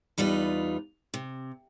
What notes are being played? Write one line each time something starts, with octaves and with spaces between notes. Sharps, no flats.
E2 G3 D#4 F4 B4
C3